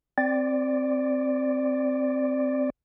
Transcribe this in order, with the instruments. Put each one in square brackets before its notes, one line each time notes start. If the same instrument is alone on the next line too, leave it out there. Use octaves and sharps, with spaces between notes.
[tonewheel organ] C4 D5